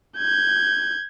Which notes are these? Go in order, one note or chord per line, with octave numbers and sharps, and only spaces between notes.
G6 G#6